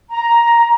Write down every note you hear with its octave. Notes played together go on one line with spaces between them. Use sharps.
A#5